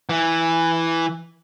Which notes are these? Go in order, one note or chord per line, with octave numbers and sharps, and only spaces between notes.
E3